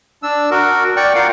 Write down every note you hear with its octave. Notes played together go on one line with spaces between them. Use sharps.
D4 E6
F#4 A#4
D5 G5 C#6
F4 A#4 F5 F#5